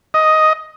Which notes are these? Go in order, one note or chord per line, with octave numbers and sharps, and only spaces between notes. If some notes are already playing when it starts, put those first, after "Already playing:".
D#5